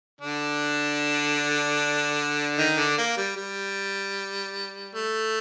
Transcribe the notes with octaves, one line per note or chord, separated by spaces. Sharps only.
D3 D4
D#3 D#4
D3 D4
A#3
G3
G3
A3